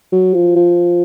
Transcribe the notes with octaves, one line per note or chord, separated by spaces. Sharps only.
F#3
F3
F3